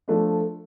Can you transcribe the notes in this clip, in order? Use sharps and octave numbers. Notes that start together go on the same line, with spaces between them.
F3 A3 D4